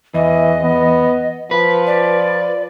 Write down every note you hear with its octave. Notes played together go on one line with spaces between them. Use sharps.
E2 E3 D#5
B3
F3 B4
D5